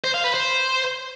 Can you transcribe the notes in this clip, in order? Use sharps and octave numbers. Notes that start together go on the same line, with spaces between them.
C5
F5
B4
C5